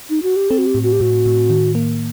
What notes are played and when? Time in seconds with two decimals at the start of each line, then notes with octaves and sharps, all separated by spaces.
0.10 D#4
0.23 F#4
0.36 G4
0.50 C4 A4
0.58 F#4
0.67 G4
0.75 A2
0.83 F#4
0.92 G4
1.00 A2 F#4
1.26 A2
1.50 D#3
1.75 A#3